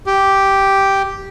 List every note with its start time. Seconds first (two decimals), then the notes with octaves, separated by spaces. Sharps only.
0.07 G4